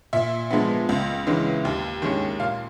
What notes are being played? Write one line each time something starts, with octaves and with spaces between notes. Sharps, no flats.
A#2 E5
F3 G#3 B3
C#2
C#3 E3 G#3
D#2
D#3 G#3 C#4
A#2 F5